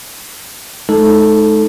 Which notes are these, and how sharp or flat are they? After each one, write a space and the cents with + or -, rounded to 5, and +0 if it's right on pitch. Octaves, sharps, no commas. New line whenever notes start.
G#3 +45 D#4 +0 A4 +0